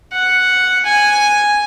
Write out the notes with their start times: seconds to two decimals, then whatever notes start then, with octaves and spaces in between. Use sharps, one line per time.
0.12 F#5
0.85 G#5